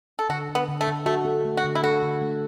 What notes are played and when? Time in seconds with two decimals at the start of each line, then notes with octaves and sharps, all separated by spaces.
0.19 A4
0.29 D3 F#4
0.49 D3
0.55 B3
0.68 D3
0.81 A3
0.87 D3
1.06 A3 F#4
1.25 A4
1.45 A3
1.57 F#4
1.64 D3
1.75 E4
1.84 F#4 A4
2.02 D3
2.21 A3